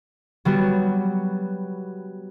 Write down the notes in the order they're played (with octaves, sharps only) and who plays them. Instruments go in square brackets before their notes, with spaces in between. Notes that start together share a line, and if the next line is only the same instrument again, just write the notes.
[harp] F#3 G3 B3 F#4